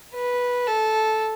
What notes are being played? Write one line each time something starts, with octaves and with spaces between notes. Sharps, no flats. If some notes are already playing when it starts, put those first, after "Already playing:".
B4
A4